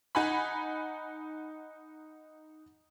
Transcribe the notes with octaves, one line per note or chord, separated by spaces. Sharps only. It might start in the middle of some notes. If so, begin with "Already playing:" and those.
D#4 F#5 G#5 B5